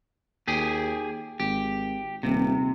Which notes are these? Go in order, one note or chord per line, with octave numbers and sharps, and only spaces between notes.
D#2 G4 G#4
G#1 G4
D#1 C3